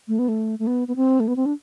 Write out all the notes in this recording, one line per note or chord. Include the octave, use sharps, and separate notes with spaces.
A3
B3
A3
A3
B3
B3
C4
A3
B3
C4
D4